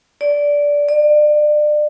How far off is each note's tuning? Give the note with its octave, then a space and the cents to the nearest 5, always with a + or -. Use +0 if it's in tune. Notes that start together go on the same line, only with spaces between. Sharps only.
D5 -15
D5 +30